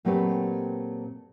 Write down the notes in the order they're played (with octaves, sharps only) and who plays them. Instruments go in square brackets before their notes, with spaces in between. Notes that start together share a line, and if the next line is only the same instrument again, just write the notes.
[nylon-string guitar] A#2 F#3 A3 C4 G4 B4